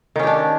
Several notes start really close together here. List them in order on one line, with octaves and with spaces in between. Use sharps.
D#3 C#4 G4 D4